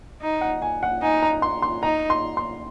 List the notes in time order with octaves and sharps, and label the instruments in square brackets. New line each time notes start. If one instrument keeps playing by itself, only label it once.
[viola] D#4
[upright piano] F#5
G#5
F#5
[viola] D#4 [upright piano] G#5
[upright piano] A#5
C6
C6
[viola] D#4 [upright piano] A#5
[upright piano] C6
C6